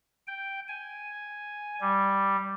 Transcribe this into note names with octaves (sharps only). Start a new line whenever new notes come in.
G5
G#5
G3